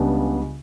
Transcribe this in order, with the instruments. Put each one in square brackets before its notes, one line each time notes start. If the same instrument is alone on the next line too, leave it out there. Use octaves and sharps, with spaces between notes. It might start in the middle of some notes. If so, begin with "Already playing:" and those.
Already playing: [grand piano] C#2 C#3 G3 B3 D4